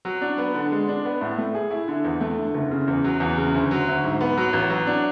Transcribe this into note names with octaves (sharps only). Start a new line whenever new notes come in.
F#3
D4
B3
D3
G#3
D4
B3
A2
A3
G#4
E4
D3
E2
A3
D3
F#1
C#3
E2
F#3
E2
C#3
D2
F#3
D2
G#2
B3
F#3
A1
F#3
D4